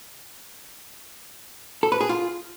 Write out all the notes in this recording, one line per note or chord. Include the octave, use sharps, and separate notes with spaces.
A4
B4
G#4
F4